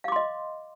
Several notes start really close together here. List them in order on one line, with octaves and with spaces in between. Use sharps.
F5 D6 C6 D#5